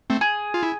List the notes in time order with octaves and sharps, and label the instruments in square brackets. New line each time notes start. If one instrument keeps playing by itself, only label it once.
[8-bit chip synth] A3 C4
[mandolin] G#4
[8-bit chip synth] F4
E4